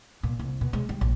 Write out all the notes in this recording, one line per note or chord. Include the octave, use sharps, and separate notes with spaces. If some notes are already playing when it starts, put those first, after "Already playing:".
A#2
C2
B2
G#3
G3
A#1